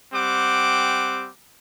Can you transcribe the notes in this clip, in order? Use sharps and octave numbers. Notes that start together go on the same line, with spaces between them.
G3 C4 F#5 D6